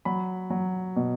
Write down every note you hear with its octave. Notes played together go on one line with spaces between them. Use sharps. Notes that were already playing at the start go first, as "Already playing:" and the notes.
F#3 B5
F#3
B2